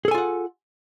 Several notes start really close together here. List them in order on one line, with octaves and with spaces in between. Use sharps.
G#4 A4 G#5 F4 F#5